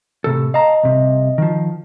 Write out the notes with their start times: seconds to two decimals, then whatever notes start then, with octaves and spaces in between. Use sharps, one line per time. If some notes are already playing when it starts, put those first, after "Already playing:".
0.24 A2 C3 A4
0.54 D#5 F5 A5 A#5
0.83 C2 C3
1.38 D#3 F3